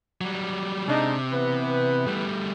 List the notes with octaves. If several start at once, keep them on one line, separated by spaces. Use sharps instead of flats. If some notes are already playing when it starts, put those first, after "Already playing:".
F#3 G3
C3 G#3 D4 D#4
E3 B3 B4
G3 A3